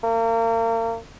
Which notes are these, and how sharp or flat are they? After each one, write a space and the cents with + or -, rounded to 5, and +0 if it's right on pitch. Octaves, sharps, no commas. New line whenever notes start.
A#3 -35